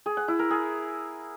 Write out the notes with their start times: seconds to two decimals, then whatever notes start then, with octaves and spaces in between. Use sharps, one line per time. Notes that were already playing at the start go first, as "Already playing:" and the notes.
0.06 G#4
0.17 F#5
0.28 E4
0.39 A#4
0.50 G#4